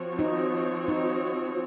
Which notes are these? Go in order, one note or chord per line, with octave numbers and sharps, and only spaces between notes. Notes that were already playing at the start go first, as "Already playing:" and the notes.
Already playing: F3 C4 F#4 C#5
D#4
D#4